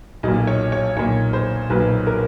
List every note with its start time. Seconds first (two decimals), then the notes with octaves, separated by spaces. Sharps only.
0.23 B1 D#5
0.28 A#2
0.47 C#5
0.72 C#5
0.97 B1 A#2 C#5
1.33 C5
1.70 B1 A#2 B4
2.07 A#4